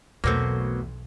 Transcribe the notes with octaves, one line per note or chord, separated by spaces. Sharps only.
B1 E2 B2 F#3 A3 A#3 C4